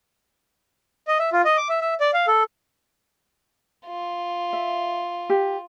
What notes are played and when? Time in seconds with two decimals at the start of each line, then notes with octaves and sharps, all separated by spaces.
1.08 D#5
1.19 E5
1.33 F4
1.45 D#5
1.57 D6
1.69 E5
1.81 E5
2.00 D5
2.14 F5
2.28 A4
3.86 F4
4.53 E5
5.30 G4